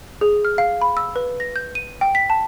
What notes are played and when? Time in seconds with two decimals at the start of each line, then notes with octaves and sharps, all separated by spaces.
0.21 G#4
0.45 F6
0.58 F5
0.81 B5
0.97 E6
1.16 B4
1.40 A#6
1.56 G6
1.75 D#7
2.01 G5
2.15 B6
2.30 A5